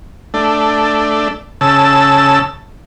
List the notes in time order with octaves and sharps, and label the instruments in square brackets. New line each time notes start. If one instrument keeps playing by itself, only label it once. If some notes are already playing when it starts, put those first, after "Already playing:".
[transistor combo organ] A3 D4
C#3 A5 E6